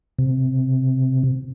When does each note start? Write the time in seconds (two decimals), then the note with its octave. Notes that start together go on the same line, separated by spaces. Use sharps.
0.19 C3